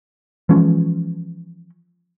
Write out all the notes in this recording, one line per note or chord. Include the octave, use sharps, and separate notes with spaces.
E3 F3 G#3 C#4